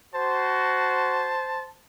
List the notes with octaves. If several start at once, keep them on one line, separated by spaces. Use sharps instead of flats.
F#4 C5 A5